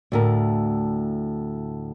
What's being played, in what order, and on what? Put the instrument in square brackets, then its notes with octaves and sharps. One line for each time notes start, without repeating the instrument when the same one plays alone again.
[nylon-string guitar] D2 A2 A#4